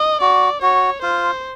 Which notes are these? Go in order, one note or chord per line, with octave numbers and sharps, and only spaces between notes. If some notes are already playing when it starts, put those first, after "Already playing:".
Already playing: D#5
F#4 D5
F#4 C#5
F4 C5